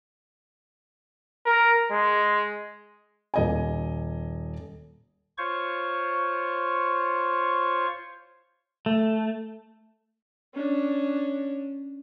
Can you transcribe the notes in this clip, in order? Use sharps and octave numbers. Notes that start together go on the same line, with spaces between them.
A#4
G#3
D#1 D#5 G#5
F4 C5 C#5 C#6
A3
C#4 D4